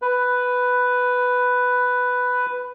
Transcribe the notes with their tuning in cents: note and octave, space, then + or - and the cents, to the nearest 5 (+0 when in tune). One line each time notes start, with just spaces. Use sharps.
B4 +5